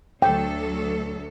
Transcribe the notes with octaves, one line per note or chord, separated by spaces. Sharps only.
D2 F#3 A4 G5